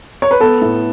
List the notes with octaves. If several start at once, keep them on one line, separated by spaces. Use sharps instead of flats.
C#5
B4
B3 A4
A2